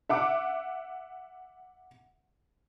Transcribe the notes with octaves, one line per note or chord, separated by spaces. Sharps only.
E5 F#5 D6